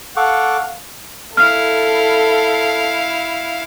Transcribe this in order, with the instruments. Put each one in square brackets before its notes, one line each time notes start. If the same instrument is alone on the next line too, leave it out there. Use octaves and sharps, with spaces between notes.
[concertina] A4 C#6 D6 [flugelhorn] F5 [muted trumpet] F#5
[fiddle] E4 F5 [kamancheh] A4 [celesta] F6